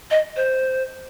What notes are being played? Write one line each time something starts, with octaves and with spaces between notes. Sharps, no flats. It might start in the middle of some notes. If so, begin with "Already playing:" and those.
D#5
C5